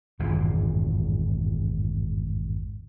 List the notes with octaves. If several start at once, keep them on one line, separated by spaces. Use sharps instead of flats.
G#1 E2 G2 A#2